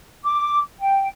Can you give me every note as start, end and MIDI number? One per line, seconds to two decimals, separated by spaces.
0.24 0.58 86
0.79 1.06 79